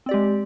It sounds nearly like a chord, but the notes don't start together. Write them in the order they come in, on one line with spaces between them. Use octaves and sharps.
C4 D5 G4 G#3